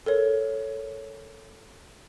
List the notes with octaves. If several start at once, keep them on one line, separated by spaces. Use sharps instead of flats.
A4 A#4 C#5